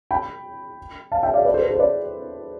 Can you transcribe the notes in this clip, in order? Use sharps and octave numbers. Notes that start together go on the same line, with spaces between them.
G5 B5
F5 A5
E5 G5
D5 F5
B4 D5
A4 C5
B4
A4 C5
B4 D5